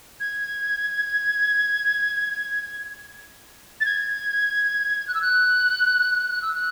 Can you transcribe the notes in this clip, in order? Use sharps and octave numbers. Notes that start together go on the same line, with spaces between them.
G#6
A6
G#6
F#6
E6
F#6
F#6
E6
F#6